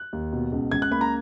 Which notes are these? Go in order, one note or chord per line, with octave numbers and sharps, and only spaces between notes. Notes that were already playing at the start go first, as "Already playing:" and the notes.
Already playing: F#6
D#2
B2
C#2
C#2 G#6
F#6
A#3 B5
A#5